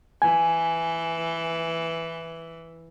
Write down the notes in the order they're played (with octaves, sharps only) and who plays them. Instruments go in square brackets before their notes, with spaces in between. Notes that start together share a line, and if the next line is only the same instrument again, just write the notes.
[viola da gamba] E3 [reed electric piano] G#5